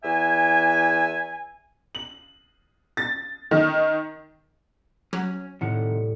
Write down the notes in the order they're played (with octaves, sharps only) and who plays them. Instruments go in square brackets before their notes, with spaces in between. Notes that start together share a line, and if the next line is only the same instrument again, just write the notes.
[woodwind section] E2 E5 G#5
[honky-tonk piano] F#7
A6
D#3
[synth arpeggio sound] F#3 [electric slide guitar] C#4
[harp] A2 G3 [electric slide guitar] C3 D#3 F#5